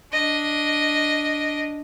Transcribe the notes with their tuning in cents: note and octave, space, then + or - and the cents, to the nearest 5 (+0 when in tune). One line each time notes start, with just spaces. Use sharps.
D4 +0 D#5 +0